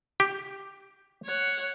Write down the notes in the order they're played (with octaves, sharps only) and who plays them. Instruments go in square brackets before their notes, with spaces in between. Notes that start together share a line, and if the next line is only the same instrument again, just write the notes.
[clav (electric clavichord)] G4
[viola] C#5 F#5